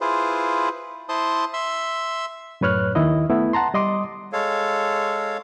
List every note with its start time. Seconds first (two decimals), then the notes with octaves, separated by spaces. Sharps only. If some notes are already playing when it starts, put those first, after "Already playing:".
0.01 E4 F4 G#4 B4 C5
1.09 E4 C5 A5 C6 D#6
1.54 E5 C6 E6
2.61 F#2 A2 B4 C#5 F6 F#6
2.95 D#2 D#3 E4 D#5
3.30 A3 B3 E4
3.53 F#5 A5 A#5 C6
3.74 G3 D#5 C6 D6 D#6
4.33 G#3 A4 C#5 F5